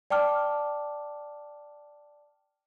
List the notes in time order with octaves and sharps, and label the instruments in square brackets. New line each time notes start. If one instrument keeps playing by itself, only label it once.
[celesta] D5 G5 A5 D6 F6